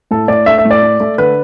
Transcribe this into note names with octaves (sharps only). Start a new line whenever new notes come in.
A2 A4
A2 D5
A3 E5
E5
A2
D5
A3
A3
D3 B4